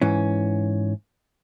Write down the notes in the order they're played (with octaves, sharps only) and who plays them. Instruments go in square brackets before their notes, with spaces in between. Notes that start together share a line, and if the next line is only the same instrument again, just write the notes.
[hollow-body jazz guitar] G#2 E3 C#4